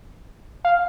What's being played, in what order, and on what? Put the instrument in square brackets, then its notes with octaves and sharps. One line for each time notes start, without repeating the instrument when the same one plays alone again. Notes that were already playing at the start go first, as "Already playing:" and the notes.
[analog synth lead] F5